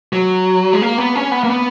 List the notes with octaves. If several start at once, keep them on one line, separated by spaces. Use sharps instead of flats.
F#3
G#3
A#3
B3
C#4
B3
A#3
B3